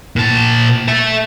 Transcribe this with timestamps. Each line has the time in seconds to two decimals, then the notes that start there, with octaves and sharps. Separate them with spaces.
0.16 A#2 A5
0.88 E5 A5